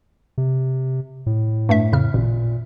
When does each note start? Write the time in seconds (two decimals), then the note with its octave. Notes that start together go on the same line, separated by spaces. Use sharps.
0.38 C3
1.26 A2
1.69 G2 A3 E5
1.93 F2 C#3 F6
2.14 A1 A#2